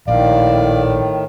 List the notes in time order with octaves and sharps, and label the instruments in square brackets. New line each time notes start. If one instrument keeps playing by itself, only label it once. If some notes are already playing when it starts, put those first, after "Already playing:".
[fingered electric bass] A#1 [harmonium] A2 D#3 [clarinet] D5 [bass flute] F5